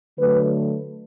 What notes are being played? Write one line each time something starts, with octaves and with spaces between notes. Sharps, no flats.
D3 F#3 A3 B4